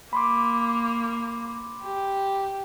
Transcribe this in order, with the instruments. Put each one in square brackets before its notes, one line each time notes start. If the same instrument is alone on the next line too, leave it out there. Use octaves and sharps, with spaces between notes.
[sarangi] A#3 [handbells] B5 C6 D6
[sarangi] G4